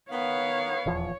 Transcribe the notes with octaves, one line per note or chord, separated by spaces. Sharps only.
D#3 B3 C#5 F5
D#1 E2 F3